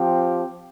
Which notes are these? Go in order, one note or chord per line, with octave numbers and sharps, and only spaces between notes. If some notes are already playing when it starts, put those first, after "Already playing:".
Already playing: F3 C4 G4